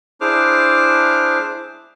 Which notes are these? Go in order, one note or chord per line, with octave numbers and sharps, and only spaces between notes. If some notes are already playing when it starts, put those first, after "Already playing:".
D4 E4 G#4 C5 D6 F6